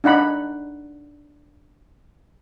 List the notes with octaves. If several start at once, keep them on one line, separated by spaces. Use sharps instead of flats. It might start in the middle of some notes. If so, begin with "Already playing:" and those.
D4 D#4 F#5 B5